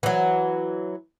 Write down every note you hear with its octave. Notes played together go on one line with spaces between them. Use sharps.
E3 F#3